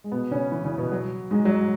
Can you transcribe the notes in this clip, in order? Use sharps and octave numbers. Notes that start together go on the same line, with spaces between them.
G#3
B2 B3
C#3 C#4
E3 E4
C#3 C#4
B2 B3
F#3
G#2 G#3
F#3